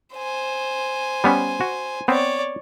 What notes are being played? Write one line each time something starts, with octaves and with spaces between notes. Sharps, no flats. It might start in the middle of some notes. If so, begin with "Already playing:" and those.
C5 G#5
G3 B3 C#4
F#4
B3 C4 C#5 D5